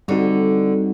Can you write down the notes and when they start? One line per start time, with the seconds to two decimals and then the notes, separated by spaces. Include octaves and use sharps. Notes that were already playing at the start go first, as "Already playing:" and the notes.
0.08 D3 G3 C4 D#4 F#4